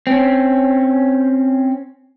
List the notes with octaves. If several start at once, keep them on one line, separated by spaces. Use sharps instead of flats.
C4 C#4